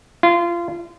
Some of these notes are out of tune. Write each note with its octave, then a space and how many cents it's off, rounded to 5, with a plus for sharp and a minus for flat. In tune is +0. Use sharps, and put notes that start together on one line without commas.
F4 -25